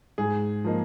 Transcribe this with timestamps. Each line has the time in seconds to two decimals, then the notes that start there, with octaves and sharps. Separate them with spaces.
0.18 G#2 G#4
0.64 F3 A#3 D#4